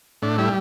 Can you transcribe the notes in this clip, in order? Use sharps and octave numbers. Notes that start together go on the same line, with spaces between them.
A2 D4
G3 E4